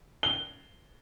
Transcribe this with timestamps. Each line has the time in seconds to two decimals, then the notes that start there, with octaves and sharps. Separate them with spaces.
0.23 G7